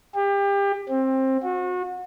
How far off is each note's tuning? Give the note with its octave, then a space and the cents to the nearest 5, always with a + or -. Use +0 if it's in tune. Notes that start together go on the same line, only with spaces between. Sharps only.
G4 +30
C4 +20
F#4 -30